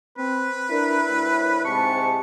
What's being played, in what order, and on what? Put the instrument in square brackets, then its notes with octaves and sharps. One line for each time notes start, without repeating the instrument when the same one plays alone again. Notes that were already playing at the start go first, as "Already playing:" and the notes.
[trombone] C4 [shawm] B4
[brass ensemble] D4 A#4 [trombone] E4
[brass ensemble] D2 A2
[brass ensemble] G#2 C3 A5 [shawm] C#6